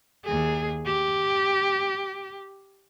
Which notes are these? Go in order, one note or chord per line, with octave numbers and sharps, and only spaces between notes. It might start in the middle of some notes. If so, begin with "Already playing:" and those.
D#2 G#4
G4